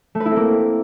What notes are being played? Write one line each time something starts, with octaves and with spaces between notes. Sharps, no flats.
A3
B4
E4
C4
A#3